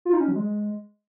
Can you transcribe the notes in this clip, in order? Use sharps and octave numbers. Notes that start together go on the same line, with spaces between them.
F4
D#4
C#4
F#3
G#3